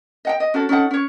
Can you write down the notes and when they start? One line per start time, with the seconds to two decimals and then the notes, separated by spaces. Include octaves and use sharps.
0.25 D#5 F#5 G5
0.40 D#5
0.54 C#4 F#4 A4 C#5
0.69 C#4 D#4 A4 F#5
0.91 C#4 C#5